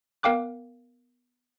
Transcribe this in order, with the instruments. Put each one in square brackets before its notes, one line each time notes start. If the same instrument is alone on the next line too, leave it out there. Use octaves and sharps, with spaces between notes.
[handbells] B3 A#4 F5 G5 D6 F#6